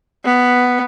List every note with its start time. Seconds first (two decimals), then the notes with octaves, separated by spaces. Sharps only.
0.25 B3